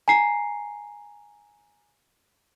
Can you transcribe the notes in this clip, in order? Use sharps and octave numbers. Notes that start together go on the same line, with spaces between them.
G#5 A#5 C7